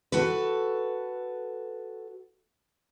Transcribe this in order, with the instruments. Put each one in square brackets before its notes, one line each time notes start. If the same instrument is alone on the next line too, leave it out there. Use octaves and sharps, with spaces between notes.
[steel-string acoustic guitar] F#4 A4 B4